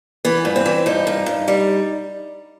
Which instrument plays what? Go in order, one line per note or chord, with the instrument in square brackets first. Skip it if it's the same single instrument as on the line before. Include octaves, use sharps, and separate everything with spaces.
[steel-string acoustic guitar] E3 B3
G2
C4
E3
G2 D#4
G2
G2
G3